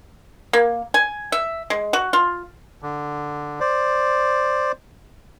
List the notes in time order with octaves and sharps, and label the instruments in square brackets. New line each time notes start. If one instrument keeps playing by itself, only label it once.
[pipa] A#3
G#5
E5
G#3
F#4
F4
[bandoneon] D3
C5 D5